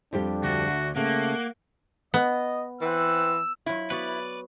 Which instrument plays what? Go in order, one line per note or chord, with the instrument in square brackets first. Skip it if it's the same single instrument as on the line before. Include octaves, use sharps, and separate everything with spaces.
[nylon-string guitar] F2 G3 G4 [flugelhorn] D4
[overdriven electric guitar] D2 [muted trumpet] F#4
[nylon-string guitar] C#3 [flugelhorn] A3 [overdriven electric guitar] A#3 [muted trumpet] F#5
[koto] B3 [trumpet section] D#5
[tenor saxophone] E3 [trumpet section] C4 C5 F#5 [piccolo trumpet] E6
[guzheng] F#3 F4 [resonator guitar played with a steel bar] E4
[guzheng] B3 F#4 [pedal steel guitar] B4 D5